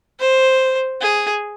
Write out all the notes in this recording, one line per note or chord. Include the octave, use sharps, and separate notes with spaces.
C5
G#4